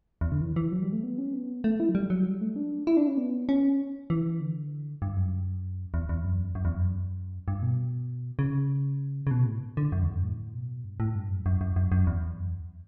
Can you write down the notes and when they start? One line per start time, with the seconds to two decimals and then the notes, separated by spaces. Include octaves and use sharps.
0.21 E2
0.32 D3
0.41 E3
0.56 E3
0.72 F#3
0.82 G3
0.93 A3
1.04 B3
1.18 C#4
1.33 B3
1.64 A3
1.80 E4
1.89 F#3
1.95 G3
2.10 F#3
2.26 G3
2.41 A3
2.56 D4
2.87 E4
2.97 D4
3.07 C#4
3.18 B3
3.49 C#4
4.10 E3
4.40 D3
5.02 G2
5.17 F#2
5.94 E2
6.09 E2
6.25 F#2
6.55 F#2
6.65 E2
6.75 F#2
7.48 G2
7.62 B2
8.39 C#3
9.27 C#3
9.31 B2
9.47 A2
9.77 D3
9.92 F#2
10.03 E2
10.13 F#2
10.23 A2
10.54 B2
10.84 G2
11.00 A2
11.15 G2
11.30 F#2
11.46 F#2
11.61 F#2
11.76 F#2
11.92 F#2
12.07 E2
12.37 F#2
12.49 E2